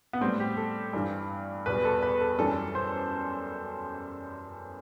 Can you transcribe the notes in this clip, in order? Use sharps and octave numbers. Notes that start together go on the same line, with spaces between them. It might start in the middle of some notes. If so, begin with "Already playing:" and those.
B3
A2 G3 C4
G4
A4
G2 E3 G3
E2 B2 G3 B4
A4
B4
A4
F#2 E3 G3 A4
C5